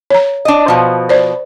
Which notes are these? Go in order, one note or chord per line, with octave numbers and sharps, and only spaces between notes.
C#5 A#5
D4 D#5
B2 F3
C5 D5